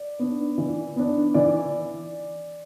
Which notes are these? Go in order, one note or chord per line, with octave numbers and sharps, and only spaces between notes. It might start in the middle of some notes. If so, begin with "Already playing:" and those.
Already playing: D5
B3 D4
E3
B3 D4
E3 D5